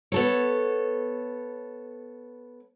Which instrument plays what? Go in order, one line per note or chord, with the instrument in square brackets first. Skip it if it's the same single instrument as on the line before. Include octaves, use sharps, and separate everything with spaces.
[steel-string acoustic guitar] B3 A4 C#5